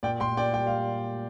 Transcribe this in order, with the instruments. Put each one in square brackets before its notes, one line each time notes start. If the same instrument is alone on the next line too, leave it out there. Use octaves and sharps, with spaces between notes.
[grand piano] A#2 D5 G5
A#2 G5 C6
A#2 D5 G5
G3 G5
G3 F5